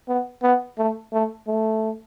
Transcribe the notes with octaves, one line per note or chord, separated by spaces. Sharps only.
B3
B3
A3
A3
A3